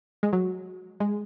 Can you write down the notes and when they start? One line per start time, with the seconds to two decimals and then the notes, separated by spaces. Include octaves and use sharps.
0.23 G#3
0.33 F#3
1.00 G#3